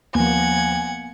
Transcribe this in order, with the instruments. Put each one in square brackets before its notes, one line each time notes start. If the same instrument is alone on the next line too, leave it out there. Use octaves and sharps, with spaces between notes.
[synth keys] D#2 F3 [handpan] A#3 B3 [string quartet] F#5 G#6 [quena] G#5